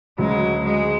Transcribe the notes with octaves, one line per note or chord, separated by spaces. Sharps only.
D2 C#3 F#3 G#3
G#3